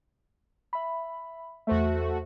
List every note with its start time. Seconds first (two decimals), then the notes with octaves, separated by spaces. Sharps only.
0.73 E5 B5
1.67 E2 A3 F#4 C5 E5